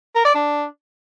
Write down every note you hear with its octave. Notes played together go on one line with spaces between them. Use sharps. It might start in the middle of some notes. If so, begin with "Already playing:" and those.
A#4
D5
D4